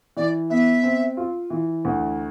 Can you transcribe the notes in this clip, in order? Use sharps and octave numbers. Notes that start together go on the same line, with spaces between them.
E3 D5
B3 E5
C4
F4
E3
D2